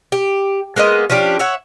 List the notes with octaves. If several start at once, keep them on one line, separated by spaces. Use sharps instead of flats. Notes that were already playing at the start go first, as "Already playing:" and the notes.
G4
G#3 A#3 B3 D#5
F3 C#4 D4 G4
C#5 E5 F#5